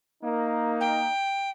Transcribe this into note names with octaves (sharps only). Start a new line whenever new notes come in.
A#3 D#4
G5